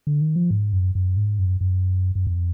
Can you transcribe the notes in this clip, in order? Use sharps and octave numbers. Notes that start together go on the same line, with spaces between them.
D3
D#3
F3
G#2
F#2
F#2
G#2
F#2
F#2
F#2
F2